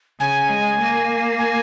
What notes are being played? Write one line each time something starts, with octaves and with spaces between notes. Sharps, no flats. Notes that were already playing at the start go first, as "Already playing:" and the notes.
C#3 G#5
G#3
A#3
G#5